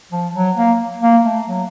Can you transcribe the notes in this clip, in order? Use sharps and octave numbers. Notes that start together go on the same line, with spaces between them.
F3
F#3
A#3
A#3
A3
F#3